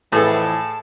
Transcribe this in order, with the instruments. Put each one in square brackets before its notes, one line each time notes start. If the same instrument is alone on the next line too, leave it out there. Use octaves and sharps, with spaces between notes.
[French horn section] F2 E3 [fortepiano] A2 G#4 A4 [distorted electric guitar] A5